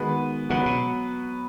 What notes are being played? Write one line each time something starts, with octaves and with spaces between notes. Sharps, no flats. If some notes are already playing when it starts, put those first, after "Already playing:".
Already playing: D#3 G#3 B3 F#4 B4
C#3 F#3 B3 F#4 B4
B2